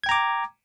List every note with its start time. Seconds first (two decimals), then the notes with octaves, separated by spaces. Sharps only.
0.04 G#6
0.06 G5
0.09 A#5
0.11 D6